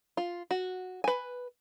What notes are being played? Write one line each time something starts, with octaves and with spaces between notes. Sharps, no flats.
F4
F#4
B4 G#5